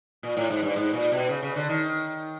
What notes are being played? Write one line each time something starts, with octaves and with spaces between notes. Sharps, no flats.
A#2
A2
G#2
G2
G#2
A#2
B2
C#3
C#3
D3
D#3